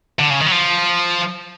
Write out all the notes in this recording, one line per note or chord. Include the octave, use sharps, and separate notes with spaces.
D3
C#3
D#3
F#3
F3